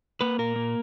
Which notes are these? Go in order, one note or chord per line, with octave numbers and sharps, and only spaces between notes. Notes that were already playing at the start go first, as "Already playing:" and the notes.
A#3 B4
A#2 A#4
A#3